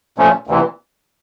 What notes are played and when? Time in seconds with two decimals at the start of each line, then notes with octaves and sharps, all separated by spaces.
0.18 A#2 F3 A3 C#4
0.47 D2 C3 E3